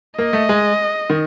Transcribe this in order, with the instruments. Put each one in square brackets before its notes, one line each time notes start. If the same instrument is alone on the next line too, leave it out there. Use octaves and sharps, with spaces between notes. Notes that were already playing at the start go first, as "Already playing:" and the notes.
[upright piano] A#3 [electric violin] D#5
[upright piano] A3
G#3
D#3